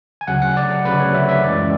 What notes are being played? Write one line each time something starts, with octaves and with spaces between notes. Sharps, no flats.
G#5
D2 C#3 F#3 F#5
F#5
D5
D2 C#3 F#3 B4
C#5
E5
E5
F#2 E3 G#3 C#4 D5